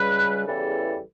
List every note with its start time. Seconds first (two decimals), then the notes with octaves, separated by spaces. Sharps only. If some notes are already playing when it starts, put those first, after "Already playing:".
Already playing: C#2 C#3 G3 B4
0.45 E2 C#3 E3 G3 A4